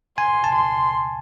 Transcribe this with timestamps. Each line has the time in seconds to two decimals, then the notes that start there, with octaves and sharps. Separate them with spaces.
0.18 G#5 C6
0.44 A5
0.56 C6